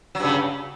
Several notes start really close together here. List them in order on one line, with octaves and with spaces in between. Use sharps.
F#3 G2 C#3